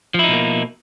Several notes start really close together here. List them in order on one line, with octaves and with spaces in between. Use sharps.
F3 E4 D#4 B2 A#3